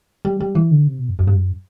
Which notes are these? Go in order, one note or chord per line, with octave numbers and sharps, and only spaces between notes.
G3
G3
E3
D3
C3
B2
F#2
F#2
G2
F#2